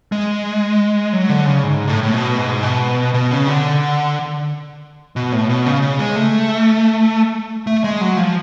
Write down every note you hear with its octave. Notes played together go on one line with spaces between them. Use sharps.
G#3
F#3
D3
C#3
G#2
A2
A2
B2
G#2
B2
B2
C#3
D3
B2
A2
B2
C#3
C#3
G#3
A3
A3
G#3
F#3
F3